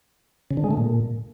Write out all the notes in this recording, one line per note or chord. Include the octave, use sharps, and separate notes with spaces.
C#3
D3
G#3
A3
A#2